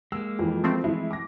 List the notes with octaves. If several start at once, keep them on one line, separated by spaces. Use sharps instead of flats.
G#3 A#3 E6
F2 E3
F3 A3 C4
E3 G#3 E4
D6 A#6